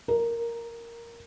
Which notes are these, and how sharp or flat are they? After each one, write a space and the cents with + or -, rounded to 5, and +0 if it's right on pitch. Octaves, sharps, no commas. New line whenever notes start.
A#4 +0